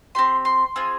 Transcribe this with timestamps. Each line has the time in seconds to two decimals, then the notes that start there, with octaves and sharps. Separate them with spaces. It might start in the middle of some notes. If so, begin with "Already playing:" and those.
0.15 C4 G4 C6
0.45 C6
0.76 C4 F4 G#4